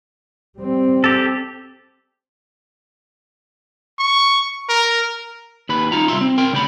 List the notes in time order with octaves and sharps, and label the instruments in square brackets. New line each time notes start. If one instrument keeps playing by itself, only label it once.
[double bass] G3 C4
[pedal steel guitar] G4 A4
[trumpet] C#6
A#4
[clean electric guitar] D#2 B4 B5
D#4 F4 A#5
C2 G#2 E5 C6
C4
A#4 G5 C6
D2 C#3 G5 B5